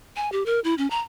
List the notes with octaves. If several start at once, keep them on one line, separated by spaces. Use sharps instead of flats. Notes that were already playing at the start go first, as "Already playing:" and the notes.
G#5
G4
A#4
E4
C#4
A#5